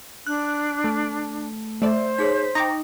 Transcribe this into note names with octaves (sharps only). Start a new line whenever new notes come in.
D4 F#6
A3
A3 C5 D5 E5
D#4 G#4 C#5 B6
D#4 G5 A#5 C#6 D6 A#6